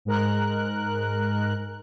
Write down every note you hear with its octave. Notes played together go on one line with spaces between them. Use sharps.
G#2 G#3 A#4 F#6